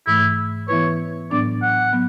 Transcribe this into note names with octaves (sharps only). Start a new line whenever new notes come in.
G#2 E3 A3 E4
E3 B3 E4 B4 C#5
A2 F#3 B3 D4 D5
F#5
F#3 B3